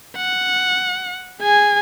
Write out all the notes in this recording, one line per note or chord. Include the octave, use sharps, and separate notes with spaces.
F#5
G#4 G#5